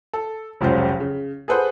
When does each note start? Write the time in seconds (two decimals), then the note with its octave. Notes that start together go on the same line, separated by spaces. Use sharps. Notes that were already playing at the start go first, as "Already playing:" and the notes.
0.13 A4
0.61 F1 C#2 F#3 C#4 F4 C5
1.00 C#3
1.48 G#4 A4 B4 C5 F#5